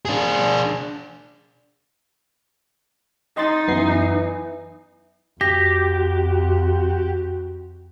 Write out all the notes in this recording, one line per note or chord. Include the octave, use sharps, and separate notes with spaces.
D4 G#4
D#4 D#5 C6 A6
F#2 E3 B3 C7
F2 F#4 G4 A#6